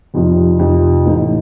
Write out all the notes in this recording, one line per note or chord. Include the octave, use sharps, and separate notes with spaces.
F1 F2 C3 F3
F1 F2 C3 F3
A1 A2 A3 D#4